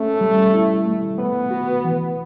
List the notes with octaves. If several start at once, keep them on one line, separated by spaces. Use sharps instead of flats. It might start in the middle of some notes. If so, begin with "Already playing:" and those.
Already playing: A3 C#4
G3
E4
A3
B3 B4
F#4
E3